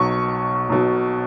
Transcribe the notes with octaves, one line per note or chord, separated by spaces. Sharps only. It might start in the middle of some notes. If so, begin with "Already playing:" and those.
Already playing: B1 B2 F#3 C#6
B1 B2 F#3